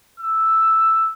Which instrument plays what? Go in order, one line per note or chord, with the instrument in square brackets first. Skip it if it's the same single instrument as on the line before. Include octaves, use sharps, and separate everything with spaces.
[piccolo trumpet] E6